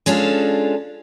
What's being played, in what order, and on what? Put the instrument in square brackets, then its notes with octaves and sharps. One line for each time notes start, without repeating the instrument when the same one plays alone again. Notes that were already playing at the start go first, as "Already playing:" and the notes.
[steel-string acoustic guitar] G#3 C#4 D4 F4 A4